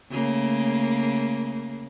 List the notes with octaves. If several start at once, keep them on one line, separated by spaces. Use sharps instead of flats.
C#3 A3 A#3